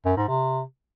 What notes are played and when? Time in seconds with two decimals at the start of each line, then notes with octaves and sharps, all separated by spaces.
0.06 F#2
0.17 G#2
0.28 C3